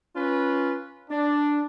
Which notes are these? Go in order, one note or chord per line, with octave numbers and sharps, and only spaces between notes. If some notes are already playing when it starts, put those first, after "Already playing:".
C#4 F4 B4
D4